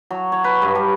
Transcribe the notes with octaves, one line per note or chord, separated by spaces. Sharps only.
F#3
C#5
B4
G2
G3